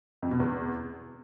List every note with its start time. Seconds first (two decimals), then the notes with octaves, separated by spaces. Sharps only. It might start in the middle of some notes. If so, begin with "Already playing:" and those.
0.22 F2
0.31 B2
0.40 E2